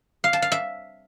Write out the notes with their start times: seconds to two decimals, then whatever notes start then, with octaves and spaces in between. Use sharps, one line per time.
0.24 F5
0.33 A5
0.42 F5
0.52 E5